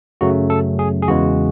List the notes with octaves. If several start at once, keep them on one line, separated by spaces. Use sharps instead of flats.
F#2 C#3 F#3 A3 F#4
A4
G#4
G#4
E2 C#3 E3 G#3 F#4